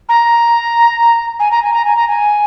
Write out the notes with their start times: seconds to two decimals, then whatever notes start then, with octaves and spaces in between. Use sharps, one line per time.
0.09 A#5
1.40 G#5
1.52 A#5
1.62 G#5
1.74 A#5
1.85 G#5
1.96 A#5
2.08 G#5